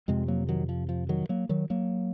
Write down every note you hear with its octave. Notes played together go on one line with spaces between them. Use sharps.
F2 C3 G#3 C4
F#3 A#3
D#3 F#3
F3
F3
D#3 F#3
F#3 A#3
D#3 F#3
F#3 A#3